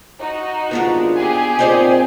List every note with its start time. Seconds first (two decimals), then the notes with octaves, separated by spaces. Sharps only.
0.20 D#4 F#4
0.71 D#2 G#2 B3 D4 F4 A#4
1.16 G4 G#4 G#5
1.59 A#2 C4 D#4 C5 D5